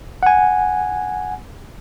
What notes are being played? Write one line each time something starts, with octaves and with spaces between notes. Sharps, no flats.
F#5 G#5